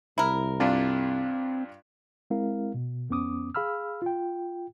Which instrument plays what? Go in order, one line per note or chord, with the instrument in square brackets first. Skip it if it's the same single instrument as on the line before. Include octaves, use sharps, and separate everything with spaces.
[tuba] C2 [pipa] E4 A#4
[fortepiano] G2 D4 F4 [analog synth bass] C4
[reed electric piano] G#3 C4 E4 A#4 F5
B2
F2 B3 C#4 D6 D#6
G#4 F5 B5 E6 F6
F4 G5